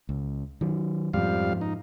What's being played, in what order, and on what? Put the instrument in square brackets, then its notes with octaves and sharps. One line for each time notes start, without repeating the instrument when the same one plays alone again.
[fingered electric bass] C#2
D#3 F#3
[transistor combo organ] F2 G3 F5 [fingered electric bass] G#2 F3
[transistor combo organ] D#4